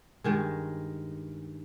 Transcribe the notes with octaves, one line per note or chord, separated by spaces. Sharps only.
G2 D#3 G#3